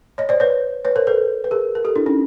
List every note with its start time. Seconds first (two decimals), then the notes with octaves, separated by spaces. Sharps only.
0.18 C#5 D#5
0.29 C5 D5
0.40 B4 C#5
0.85 B4 C#5
0.96 A#4 C5
1.07 A4 B4
1.44 B4
1.51 G#4 A#4
1.75 A#4
1.85 G4 A4
1.96 D4 E4
2.06 C#4 D#4